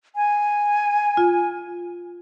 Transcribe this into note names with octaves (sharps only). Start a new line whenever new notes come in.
G#5
F4